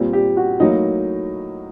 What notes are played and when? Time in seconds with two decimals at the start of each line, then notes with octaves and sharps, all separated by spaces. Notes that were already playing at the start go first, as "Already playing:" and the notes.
Already playing: A#2 G3 C4
0.13 G4
0.37 F#4
0.60 A2 F#3 A#3 D#4